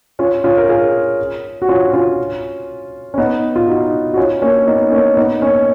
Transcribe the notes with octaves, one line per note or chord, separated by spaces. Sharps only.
C#4 F4
C#4 F4
A#4
F4 G#4
F#4
C#4 F4
C#4 F4
C#4
B3 D#4
F4
D#4 F#4
F#4
C#4 F4
A#3 C#4
B3 D#4
A#3 C#4
B3 D#4
A#3 C#4